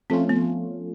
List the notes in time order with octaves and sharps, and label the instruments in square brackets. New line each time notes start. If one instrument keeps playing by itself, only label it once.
[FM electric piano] F3 A3 C#4 F4 [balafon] C4
[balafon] B3